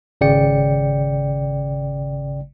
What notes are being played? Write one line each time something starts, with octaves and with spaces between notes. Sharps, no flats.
G#1 C#3 D5 G5 C#7